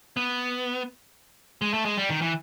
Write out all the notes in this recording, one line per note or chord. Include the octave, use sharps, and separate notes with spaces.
B3
G#3
A3
G#3
G3
D#3
E3